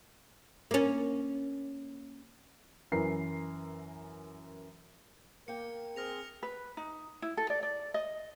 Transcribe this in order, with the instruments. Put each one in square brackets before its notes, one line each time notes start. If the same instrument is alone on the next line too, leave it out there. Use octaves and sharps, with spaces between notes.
[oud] A#3 C#4
[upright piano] F#2 E3 A#4 B4 C7
[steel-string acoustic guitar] A#3 G5 [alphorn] A#4 [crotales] C#7
[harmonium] C4 G#4 [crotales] F6 A#6 F7
[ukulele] B4
D#4
E4
A4
D5
D5
D#5